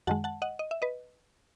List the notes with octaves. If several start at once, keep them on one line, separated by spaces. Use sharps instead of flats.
F#2 D#3 G#3 F#5 A5
F#5 A5
D#5 F#5
D#5
E5
B4 D#5